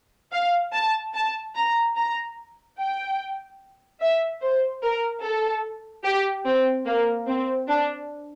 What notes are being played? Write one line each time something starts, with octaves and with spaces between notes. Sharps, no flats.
F5
A5
A5
A#5
A#5
G5
E5
C5
A#4
A4
G4
C4
A#3
C4
D4